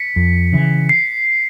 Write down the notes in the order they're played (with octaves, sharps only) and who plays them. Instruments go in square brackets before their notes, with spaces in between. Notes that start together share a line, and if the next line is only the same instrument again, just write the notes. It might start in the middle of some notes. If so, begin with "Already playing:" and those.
Already playing: [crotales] B6 C#7
[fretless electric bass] F2
C#3 E3
[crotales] C7